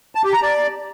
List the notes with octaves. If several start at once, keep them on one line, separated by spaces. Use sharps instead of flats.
A5
G4
A#5
D5